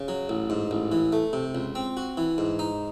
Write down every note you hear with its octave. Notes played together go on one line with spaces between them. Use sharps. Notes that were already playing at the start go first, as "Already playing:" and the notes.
Already playing: C#3
F#3
A1
G#2
A1
E3
A3
C3
C#2
C4
F#4
E3
G#2
D#4